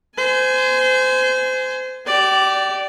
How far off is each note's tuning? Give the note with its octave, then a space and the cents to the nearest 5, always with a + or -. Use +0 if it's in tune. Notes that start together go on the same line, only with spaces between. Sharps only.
C5 -25 G#5 +10
G4 -35 D5 +0